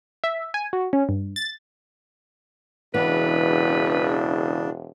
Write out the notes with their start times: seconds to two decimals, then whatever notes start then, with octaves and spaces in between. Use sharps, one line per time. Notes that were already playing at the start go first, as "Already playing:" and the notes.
0.24 E5
0.54 G#5
0.73 F#4
0.93 C#4
1.09 G2
1.36 A6
2.94 E1 C#3 E3 B3 D4 B4